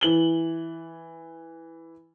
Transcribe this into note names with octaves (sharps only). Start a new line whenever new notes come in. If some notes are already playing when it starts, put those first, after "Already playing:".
E3 F#7 G7